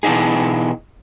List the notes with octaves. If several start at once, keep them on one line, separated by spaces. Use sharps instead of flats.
B2 E3 G3 D4 D#4 G#4